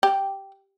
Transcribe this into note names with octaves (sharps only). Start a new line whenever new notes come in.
G4